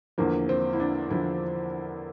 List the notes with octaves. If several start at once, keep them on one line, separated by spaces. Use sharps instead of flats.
E2 D3 F3 A#3
C4
E4
D4
E2 D3 F3 E4